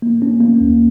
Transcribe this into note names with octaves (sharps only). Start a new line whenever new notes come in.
A#3
C#4
A#3
D#2